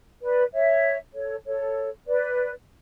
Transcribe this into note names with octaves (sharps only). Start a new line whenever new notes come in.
B4 D5
C#5 E5
A4 C#5
A4 C#5
B4 D5